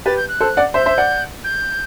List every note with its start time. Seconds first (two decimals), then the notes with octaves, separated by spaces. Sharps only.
0.06 G4 B4 A6
0.17 G6
0.28 F#6
0.41 A4 C5
0.57 D5 F#5
0.74 C5 E5 G6
0.86 C5 E5
0.98 D5 F#5
1.44 G6